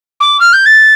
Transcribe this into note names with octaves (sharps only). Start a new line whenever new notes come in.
D6
F6
G6
A6